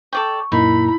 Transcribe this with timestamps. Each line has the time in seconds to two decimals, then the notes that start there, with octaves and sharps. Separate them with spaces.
0.13 A4 D5 G5 C#6
0.52 F#2 A#2 A#3 D#4 E4 B5